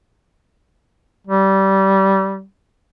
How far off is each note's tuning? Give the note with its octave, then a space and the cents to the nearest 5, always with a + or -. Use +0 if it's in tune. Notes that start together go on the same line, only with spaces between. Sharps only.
G3 -20